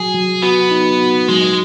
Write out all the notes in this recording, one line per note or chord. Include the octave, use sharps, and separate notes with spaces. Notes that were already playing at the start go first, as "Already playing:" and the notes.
Already playing: F#3 F#4 G#4
F#3
B3 F#4
D#4
F#4
F#3 G#3